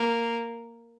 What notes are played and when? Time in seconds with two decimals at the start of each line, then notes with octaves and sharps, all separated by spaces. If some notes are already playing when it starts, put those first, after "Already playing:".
Already playing: A#3